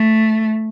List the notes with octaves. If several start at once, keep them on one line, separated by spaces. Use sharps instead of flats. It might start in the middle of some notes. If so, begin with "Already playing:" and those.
Already playing: A3